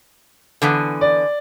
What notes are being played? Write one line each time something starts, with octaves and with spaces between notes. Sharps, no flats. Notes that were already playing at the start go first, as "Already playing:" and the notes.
D3 E3 B3
D5